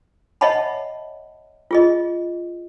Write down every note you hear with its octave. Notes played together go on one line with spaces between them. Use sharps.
C#5 D#5 E5 F#5 A5 B5
F4 G#4 D#5